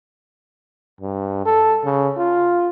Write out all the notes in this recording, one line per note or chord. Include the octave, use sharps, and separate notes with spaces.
G2
A4
C#3
F4